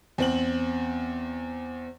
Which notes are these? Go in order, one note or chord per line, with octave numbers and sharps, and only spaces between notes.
E2 C4 F#7